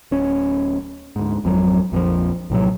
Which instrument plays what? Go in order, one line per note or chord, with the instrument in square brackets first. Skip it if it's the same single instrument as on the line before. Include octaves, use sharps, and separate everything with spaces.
[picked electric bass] D1 C#4
D2 G#2
G#1 F2 E3 F#3
A#1 F2 E3 F3
A#1 A2 C3 F#3